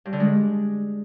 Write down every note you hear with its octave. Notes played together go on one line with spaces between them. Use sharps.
G2
D3
G#3